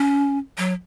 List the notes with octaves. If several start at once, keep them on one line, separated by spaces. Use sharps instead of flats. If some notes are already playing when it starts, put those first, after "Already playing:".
Already playing: C#4
F#3